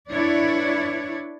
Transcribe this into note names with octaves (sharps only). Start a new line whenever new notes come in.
D4 E4 B4 C#5 D5